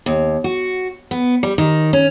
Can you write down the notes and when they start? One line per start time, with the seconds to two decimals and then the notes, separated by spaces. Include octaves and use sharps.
0.06 D#2
0.44 F#4
1.11 B3
1.43 G3
1.58 D#3
1.93 C#4